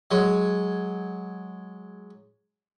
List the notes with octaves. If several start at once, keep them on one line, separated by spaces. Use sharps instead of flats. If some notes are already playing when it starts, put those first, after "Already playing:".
F#3 G#3